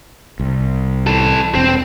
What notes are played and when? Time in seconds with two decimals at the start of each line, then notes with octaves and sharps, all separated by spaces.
0.40 C2
1.07 E3 A4
1.55 E1 C4